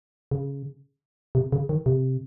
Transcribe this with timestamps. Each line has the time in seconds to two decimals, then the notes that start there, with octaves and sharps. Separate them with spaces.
0.31 C#3
1.35 C3
1.52 C#3
1.69 D#3
1.86 C3